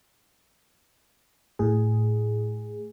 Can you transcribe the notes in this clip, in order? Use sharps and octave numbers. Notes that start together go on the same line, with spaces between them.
A2 G#4